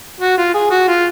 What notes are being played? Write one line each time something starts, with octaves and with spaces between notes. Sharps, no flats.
F#4
F4
G#4
F#4
F4